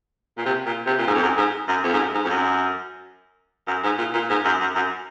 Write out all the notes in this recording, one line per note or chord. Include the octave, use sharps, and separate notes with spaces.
A#2
C3
A#2
C3
A#2
G#2
F2
F#2
G#2
F#2
F2
G#2
F#2
G#2
F2
F#2
F#2
G#2
A#2
A#2
G#2
F#2
F#2
F#2